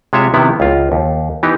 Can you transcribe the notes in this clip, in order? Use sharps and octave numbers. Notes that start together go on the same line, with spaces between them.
C3 G#3 F4 C#5 E5
C3 D#3 F3 B3 E4
C#2 F4
D#2
E3 B3 D#4 G4